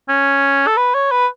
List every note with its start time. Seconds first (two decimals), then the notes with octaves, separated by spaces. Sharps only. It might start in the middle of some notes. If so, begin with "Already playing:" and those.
0.09 C#4
0.67 A4
0.77 B4
0.94 C#5
1.11 B4